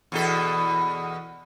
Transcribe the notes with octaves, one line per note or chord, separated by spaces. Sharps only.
E2 B2 A4